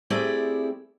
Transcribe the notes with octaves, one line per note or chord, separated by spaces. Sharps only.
A3 C4 E4 G4 G#4 D5